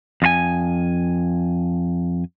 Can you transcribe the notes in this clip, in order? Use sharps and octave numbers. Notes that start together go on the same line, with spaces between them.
F2 F4 G#5